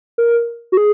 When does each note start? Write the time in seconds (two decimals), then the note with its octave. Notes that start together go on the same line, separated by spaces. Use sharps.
0.18 A#4
0.72 F#4
0.77 G#4